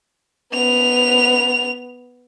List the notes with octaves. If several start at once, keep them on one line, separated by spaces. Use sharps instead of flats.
B3 F7